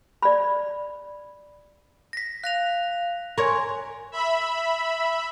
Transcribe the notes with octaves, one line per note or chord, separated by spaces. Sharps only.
D5 B5
A#6 B6
F5 F#6 A#6 F7
A#4 C#5 G#5 C6
E5 B5